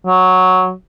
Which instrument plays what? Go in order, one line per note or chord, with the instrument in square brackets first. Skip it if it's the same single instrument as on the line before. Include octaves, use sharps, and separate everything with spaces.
[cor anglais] F#3